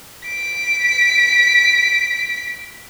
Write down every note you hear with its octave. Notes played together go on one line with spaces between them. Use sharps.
B6 D7